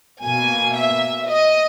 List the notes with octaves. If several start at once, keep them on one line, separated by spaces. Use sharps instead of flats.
B2 A#3 G#5
E5
D#5